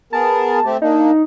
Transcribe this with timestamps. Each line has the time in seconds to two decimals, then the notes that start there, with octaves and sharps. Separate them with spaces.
0.13 B3 G#4 A#4 A5
0.65 A3 C4 G4
0.82 A#3 D4 D#4